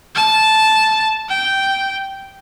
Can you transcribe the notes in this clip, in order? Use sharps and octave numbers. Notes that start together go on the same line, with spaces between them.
A5
G5